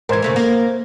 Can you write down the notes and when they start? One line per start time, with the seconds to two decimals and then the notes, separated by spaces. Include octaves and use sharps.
0.09 G#2 E3 A#4 C5 G#6
0.22 C#3 A3 A#3
0.36 A#3